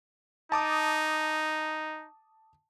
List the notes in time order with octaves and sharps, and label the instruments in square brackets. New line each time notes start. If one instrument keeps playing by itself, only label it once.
[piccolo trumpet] D#4 [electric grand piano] A5 D6 D#6